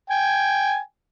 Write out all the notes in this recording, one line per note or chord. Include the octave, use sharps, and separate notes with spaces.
G5 G#5